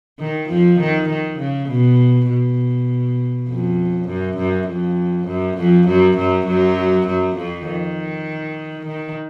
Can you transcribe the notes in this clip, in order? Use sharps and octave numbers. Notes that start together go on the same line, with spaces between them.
D#3
F2 F3
D#3
D#3
C#3
B2
B2
F2
F#2
F#2
F2
F#2
F2 F3
F#2 F#3
F#2 F#3
F#2 F#3
F#2 F#3
F2 F3
D#3
D#3